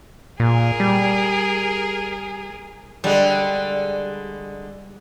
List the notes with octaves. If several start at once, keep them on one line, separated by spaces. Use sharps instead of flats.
A#2 G#4 A#4
G3
D3 G3 G#3